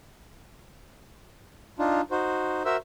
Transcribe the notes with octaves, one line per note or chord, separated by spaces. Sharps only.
D4 D#4 F4
D#4 F#4 C5
F#4 A#4 C5 E5 E6